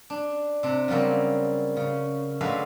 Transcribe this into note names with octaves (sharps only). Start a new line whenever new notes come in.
D4
C3 D4
C#3 F#3 G3 A#3 C4
C#3
D3 F#3 G#3 A3 B4 F5